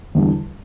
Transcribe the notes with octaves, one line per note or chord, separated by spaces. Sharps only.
E2 D3 G3